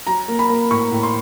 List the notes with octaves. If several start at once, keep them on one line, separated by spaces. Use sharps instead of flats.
F#3 A#5
A#3
B5
A#3
A2 C#6
A2
C6